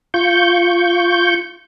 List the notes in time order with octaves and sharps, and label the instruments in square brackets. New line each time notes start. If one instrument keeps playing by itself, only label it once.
[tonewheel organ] F4 C#6 G6